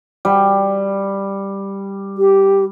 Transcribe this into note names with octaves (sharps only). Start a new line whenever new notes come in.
G3
G4